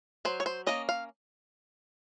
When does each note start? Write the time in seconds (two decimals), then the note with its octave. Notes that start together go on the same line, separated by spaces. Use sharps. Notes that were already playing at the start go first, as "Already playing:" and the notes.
0.25 F#3 C5
0.40 C#5
0.46 C5
0.67 A#3 C#4 D#5
0.89 F5